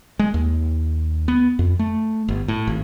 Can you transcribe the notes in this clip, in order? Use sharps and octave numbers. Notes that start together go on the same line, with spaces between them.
G#3
D#2
B3
F2
A3
G1
A2
G#1